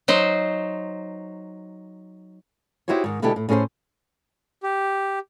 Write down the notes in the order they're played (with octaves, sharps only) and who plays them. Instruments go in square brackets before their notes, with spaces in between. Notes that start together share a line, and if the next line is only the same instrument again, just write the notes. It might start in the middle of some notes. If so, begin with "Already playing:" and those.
[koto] F#3 D#4 C5
[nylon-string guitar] D#4 E4 F#4 G4 C5 C#5
G#2 D#3
B2 D3 G#3 E4 G4 A4
A2
A2 C#4 G#4 A#4 C5
[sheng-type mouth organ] G4